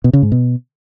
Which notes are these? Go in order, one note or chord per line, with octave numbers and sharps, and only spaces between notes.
B2
C#3
G#2
B2